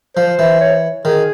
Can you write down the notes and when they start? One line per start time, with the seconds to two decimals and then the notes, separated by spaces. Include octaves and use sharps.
0.17 F3 C5
0.39 E3
0.61 C#5
1.05 D#3 G#4